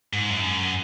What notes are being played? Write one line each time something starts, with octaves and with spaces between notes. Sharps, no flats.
G#2
F#2